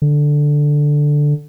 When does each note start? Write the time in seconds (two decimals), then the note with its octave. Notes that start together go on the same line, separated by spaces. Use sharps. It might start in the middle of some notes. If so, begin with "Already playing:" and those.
0.02 D3